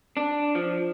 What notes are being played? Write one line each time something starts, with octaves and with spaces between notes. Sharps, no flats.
D4
F3